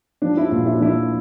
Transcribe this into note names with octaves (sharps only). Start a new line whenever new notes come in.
F3 D4
E4
A#2 F4
E4
D4
F3 E4